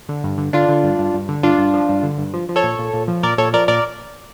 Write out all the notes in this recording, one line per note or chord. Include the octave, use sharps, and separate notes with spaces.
D3
G2
D3
D3 D4 F4
D3
G2
G2
G2
D3
G2 D4 F4
G2
F3
G2
D3
G2
F3
F3
A4 C#5
A#2
A#2
A#2
F3
A#2 A#4 D5
A#2 A4 C#5
F3 A#4 D5
A#2 A#4 D5